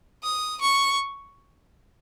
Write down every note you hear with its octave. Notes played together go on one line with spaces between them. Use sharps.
D#6
C#6